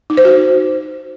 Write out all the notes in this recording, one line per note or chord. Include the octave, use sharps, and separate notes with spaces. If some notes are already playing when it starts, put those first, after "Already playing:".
D#4
C5
F#4